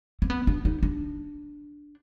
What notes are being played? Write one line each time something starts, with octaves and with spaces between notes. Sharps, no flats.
C4
B3
D4
D#4
D4